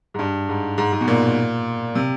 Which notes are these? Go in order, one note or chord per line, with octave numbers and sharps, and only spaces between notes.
G#2
G2
G#2
G#2
G#2
B2
A#2
C3